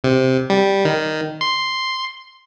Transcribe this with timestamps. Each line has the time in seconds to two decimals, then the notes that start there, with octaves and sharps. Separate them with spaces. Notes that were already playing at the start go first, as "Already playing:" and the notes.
0.04 C3
0.50 G3
0.85 D#3
1.41 C6